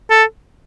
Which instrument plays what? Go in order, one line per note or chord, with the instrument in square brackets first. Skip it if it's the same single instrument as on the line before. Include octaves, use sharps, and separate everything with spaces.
[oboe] A4